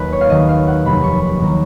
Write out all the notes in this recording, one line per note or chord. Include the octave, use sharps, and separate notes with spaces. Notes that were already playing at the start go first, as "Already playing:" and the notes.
Already playing: D#2 D#3 F#3 B4
C#5
F5
D#2 D#3 F#3 D#5
F5
F#5
F1 D#2 D#3 F#3 B5
C#6
B5
D#2 D#3 F#3 A#5